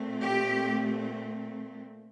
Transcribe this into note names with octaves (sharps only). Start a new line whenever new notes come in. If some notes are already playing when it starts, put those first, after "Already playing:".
Already playing: A#2 A3 C4
G4